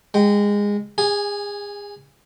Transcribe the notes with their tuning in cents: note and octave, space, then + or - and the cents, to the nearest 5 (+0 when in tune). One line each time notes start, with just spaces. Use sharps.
G#3 -20 G5 +0
G#4 -30 G#5 +0